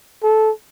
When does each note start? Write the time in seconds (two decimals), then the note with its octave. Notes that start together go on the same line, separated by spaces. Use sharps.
0.23 A4